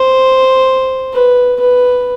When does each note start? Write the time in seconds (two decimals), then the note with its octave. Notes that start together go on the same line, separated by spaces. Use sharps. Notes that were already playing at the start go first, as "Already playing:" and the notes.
Already playing: C5
1.13 B4
1.60 B4